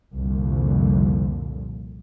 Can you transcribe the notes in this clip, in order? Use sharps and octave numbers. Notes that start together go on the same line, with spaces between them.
C2 F2 A#2 D3